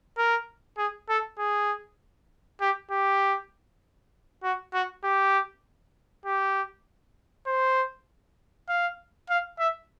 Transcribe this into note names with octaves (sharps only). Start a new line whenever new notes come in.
A#4
G#4
A4
G#4
G4
G4
F#4
F#4
G4
G4
C5
F5
F5
E5